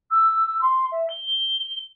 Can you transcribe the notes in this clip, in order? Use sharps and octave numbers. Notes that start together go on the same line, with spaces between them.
E6
C6
E5
G7